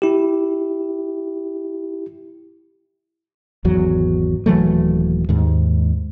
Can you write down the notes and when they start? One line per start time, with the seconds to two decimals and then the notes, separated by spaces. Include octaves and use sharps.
0.02 E4 G4
3.65 G#1 E2 F#3
4.46 D#1 E3 F#3 A3
5.29 D#2 G#2